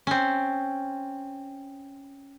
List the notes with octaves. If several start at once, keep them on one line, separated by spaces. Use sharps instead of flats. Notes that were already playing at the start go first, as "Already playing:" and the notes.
C4 C#4